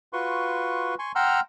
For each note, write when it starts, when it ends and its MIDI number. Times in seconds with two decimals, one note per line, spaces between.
0.13 0.95 65
0.13 0.95 66
0.13 0.95 71
0.13 0.95 84
0.13 0.95 85
0.99 1.12 80
0.99 1.12 84
0.99 1.12 85
1.15 1.40 78
1.15 1.40 79
1.15 1.40 82
1.15 1.40 84
1.15 1.40 88
1.15 1.40 89